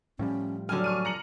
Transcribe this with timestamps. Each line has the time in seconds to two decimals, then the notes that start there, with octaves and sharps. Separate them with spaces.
0.19 A2 F3 G3 C#4
0.69 D3 F#3 G#5 F6
0.84 C#6 F6 D#7
1.05 A#5 C#7 F#7